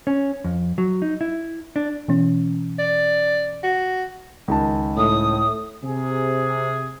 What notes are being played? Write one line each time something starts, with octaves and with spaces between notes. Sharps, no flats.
C#4
F2
F#3
D#4
E4
D4
B2 E3 C#4
D5
F#4
C#2 D#3 A5
A2 D#6
C3 G#4